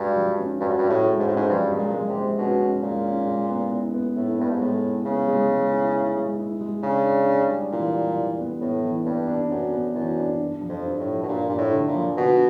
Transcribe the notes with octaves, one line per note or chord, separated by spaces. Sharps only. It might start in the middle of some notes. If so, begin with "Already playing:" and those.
Already playing: G2 G#3 F#4
F3
C#4
G2 F#4
F#2
G2
F#4
A2
G#3
G#2
A2 C#4
G#2
G2 F3
G#3
A#2
G#3
C3
G#3
B2 C#4
C#4
A#2 G#3
C#4
G#3
B3
E4
B3
A2 E4
G2 B3
G#2
A2 G#3
E4
C#3 B3
G#3
G#3
E4
E4
G#3
E4
G#3
C#3 D4
D4
D4
G3
A#2 E3
G3
E3
B3
A2 B3
E3
G2 B3
D4
F#2 B3
B3
F#2 E3
D4
G2
F3
F2
G2
A2
F3
B2
G2 A#2
G2 A#2
A2
D3
A#2
F3
B2 D3